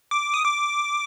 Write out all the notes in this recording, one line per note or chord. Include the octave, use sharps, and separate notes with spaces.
D6
D#6
D6